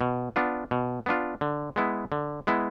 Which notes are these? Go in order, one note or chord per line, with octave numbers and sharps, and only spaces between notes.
B2
B3 D4 F4
B2
B3 D4 F4
D3
G#3 B3 E4
D3
G#3 B3 E4